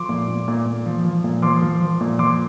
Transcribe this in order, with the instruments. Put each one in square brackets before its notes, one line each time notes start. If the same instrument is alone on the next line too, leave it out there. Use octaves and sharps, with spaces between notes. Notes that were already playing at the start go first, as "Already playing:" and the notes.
Already playing: [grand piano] F3 C6 D6
A#2
A#2
A#2
A#2
F3
F3
A#2
F3 C6 D6
F3
F3
A#2
F3 C6 D6